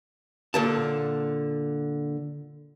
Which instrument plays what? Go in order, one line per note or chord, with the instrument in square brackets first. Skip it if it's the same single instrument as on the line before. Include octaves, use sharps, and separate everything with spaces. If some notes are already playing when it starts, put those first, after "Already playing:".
[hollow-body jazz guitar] A#2 D3 A5